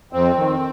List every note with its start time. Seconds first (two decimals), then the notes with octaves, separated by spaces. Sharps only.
0.13 F2 C4
0.37 D#3